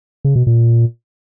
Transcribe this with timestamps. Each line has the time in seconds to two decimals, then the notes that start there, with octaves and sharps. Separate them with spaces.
0.25 C#3
0.36 B2
0.47 A#2